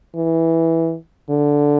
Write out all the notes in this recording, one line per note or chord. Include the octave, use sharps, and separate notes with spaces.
E3
D3